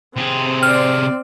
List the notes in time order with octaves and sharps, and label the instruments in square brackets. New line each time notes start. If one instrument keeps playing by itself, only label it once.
[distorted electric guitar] C3 G#4 [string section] C4
[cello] C5 D5 [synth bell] F6